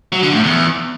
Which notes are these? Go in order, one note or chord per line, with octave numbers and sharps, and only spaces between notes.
F#3
D3
A2
E2